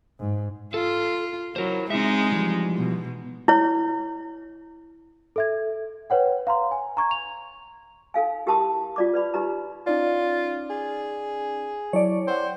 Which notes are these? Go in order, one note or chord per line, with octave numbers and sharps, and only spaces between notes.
G#2
F4 A4
F#3 E4 A#4 C5
G#3 C4 D#4 E5
E3 F3 G3
B2
E4 C#5
A4 E5 G#6
B4 C#5 F#5 G5
F5 A#5 C6
G#5
A#5 C#6 G#6
F7
D#4 A4 F5 G#5
E4 G4 A#4 A5 C6 D#6
F4 D5 D6
B4 D5 B5
D#4 G4 B4 A#5
C#4 D#4 F4 D5
G#4
F#3 E4 C#5 D5 A5
C5 F#5 G5